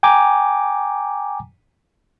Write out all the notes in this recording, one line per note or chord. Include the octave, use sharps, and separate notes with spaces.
G5 G#5 A#5 D6